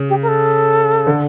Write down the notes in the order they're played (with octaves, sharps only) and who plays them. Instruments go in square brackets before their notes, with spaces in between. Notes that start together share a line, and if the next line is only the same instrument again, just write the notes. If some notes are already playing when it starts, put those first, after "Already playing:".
Already playing: [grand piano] C#3
[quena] G4
A#4
A4
[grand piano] D3